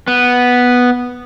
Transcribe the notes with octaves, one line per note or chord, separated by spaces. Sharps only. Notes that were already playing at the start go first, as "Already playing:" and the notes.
B3